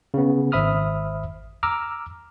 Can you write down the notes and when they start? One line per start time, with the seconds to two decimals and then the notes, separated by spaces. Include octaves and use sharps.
0.14 C#3 B3
0.52 G#1 C5 E5 B5 D#6 F6
1.63 A#5 D6 E6 F6